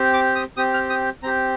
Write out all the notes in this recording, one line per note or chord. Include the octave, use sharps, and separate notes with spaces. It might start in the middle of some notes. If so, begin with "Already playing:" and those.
Already playing: C4 G4
D6
D#6
C4 G4 D#6
F6
D#6
C4 G4 A#5